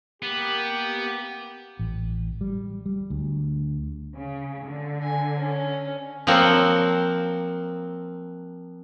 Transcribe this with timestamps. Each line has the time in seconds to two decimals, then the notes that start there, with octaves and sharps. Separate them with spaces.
0.23 A#3 B3 G4
1.79 A1
2.41 G3
2.86 G3
3.10 D2
4.15 C#3
4.66 D3
5.02 G#5
5.36 C#4
6.27 F3 F#3 A#3 C4 F#4